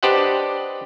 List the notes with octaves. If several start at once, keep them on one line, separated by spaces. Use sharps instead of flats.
D4 G4 B4 C5 D#5 F#5